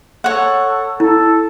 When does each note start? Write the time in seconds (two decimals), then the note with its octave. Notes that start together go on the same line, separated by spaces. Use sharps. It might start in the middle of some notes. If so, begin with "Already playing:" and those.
0.24 A4 C#5 F#5
1.00 E4 A4